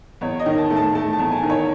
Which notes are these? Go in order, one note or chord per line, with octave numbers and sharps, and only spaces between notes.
E2 C#5
D#5
D#3
A5
A3
A5
A3 A5
A5
E2
G#5
D#3
C#5